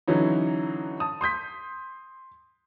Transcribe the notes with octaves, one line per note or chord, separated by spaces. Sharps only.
D3 E3 F#3 C#4 D#4
A5 D#6
C6 D#6 G6 B6